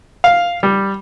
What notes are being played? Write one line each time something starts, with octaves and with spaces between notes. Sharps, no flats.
F5
G3